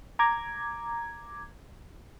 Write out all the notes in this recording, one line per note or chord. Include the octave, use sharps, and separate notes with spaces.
A#5 D6 G#6